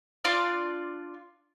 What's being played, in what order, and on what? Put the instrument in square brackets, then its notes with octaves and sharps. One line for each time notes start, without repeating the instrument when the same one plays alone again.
[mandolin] D4 F4 D5 F5